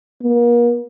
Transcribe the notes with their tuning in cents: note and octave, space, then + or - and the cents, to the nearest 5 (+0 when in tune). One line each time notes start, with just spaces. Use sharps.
A#3 +40